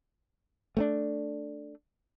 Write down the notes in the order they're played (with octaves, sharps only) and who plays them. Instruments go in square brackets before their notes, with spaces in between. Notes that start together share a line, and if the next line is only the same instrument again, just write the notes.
[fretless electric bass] A3 B3 D4